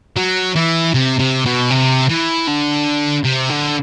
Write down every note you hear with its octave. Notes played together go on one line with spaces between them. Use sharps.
F#3
E3
C3
C3
B2
C3
E3
D3
C3
D3